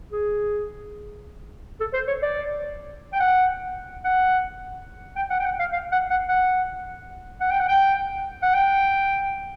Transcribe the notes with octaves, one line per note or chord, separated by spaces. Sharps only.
G#4
A4
C5
C#5
D5
G5
F#5
F#5
G5
F#5
G5
F#5
F5
F5
F#5
F#5
F#5
F#5
G5
F#5
G5
F#5
G5